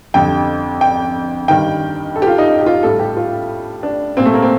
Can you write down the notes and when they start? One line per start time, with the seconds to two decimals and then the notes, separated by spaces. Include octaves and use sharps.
0.14 F2 D3 G3 G5
0.81 G5
1.48 G2 D#3 G3 G5
2.16 A4
2.22 G4
2.27 F4
2.38 D#4
2.49 D#4
2.61 G4
2.66 F4
2.83 A2 G3 A4
3.00 G4
3.17 F4
3.83 D4
4.17 A#2 G3 C4
4.26 A3
4.34 A#3
4.42 C4